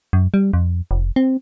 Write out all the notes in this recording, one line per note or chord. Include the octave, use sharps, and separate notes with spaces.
F#2
G3
F2
F1
C4